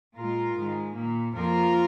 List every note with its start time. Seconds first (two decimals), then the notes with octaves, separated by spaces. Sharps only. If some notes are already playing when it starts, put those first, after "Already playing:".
0.15 A#2 G#3 F4 A#4
0.55 G#2 D#3 G#3
0.95 A#2 A#3
1.34 F2 F3 A#3 F4 A#4